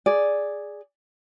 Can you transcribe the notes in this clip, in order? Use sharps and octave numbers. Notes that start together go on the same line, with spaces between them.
G#4 D5